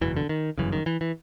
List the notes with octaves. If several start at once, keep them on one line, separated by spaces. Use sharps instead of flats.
F#1 E2 B2 E3
D3
D#3
G1 F#2 C#3 E3
D#3
E3
E3